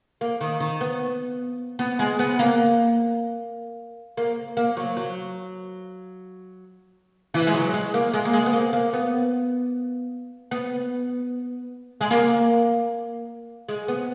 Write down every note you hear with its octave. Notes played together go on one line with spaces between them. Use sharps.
A#3
D#3
D#3
B3
B3
G#3
B3
A#3
A#3
A#3
F#3
F#3
E3
G#3
F#3
G#3
A#3
G#3
A#3
G#3
B3
A#3
A#3
B3
B3
G#3
A#3
G#3
B3